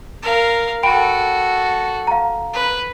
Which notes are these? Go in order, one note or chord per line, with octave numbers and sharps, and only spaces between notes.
A#4 F5
F#4 A4 G5 B5 D7
F5 A#5
B4